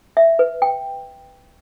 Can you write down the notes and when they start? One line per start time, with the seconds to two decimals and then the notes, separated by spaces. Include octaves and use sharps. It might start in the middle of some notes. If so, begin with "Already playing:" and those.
0.17 E5
0.39 B4
0.62 G5